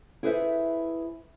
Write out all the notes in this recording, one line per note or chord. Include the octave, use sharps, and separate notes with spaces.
E4 G#4 A4 B4 C5 E5